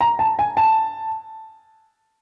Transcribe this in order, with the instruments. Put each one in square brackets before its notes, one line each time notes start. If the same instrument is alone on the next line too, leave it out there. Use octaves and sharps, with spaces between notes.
[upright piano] A#5
A5
G#5
A5